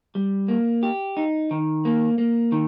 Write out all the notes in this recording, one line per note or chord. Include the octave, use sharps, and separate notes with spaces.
G3
A#3
G4
D#4
D#3
A#3
A#3
D#3